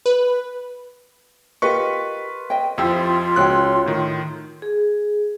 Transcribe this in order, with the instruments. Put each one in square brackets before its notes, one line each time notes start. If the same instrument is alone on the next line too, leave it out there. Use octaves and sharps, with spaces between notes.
[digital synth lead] B4
[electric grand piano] F4 B4 C#6 [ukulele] G4 A#4 D#5
[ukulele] D#5 G5
[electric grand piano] F2 F3 E6 [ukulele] E4 G4 G5 [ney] F4
[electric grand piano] C#2 F#6 [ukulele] F#4 C#5 G5
[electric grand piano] A2 D#3
[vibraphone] G#4